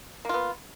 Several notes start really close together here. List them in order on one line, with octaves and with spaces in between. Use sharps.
A#3 F4 B3